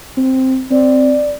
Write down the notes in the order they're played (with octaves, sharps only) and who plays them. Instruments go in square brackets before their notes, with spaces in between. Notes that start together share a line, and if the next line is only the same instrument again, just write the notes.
[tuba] C4
[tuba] C4 [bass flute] D5